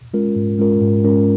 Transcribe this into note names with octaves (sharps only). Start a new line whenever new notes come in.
G#3 C#4 F4 A#4
G#2
G#3 C#4 F4 A#4
G#2
G#3 C#4 F4 A#4